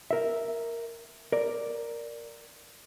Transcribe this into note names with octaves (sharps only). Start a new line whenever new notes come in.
A#4 E5
A#4 D5